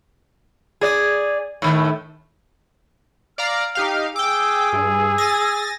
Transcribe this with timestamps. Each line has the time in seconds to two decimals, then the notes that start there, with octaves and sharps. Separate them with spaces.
0.81 G#4 D5
1.62 A2 D#3 A3
3.38 D5 F5 A#5 F6
3.75 D#4 G4 F5
4.16 G#4 G5 D6 E6
4.73 G2 E6
5.18 G#5 A6 A#6